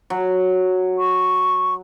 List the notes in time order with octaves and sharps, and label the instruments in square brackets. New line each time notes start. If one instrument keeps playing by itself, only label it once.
[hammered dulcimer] F#3
[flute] C#6